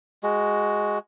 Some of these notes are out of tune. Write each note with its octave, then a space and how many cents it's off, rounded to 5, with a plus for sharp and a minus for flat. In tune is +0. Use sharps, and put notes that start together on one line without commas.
G#3 +0 F#4 +5